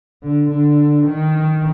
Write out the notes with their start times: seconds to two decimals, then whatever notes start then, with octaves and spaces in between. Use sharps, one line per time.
0.23 D3
0.50 D3
1.06 D#3